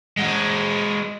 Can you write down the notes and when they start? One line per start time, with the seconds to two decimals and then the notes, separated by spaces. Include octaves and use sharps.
0.17 G#3 F#4